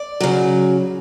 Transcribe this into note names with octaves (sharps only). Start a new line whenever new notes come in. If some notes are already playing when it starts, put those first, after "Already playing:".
Already playing: D5
C#3 F#3